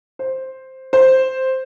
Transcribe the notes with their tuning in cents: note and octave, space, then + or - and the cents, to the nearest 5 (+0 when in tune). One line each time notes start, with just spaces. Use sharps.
C5 +5
C5 +0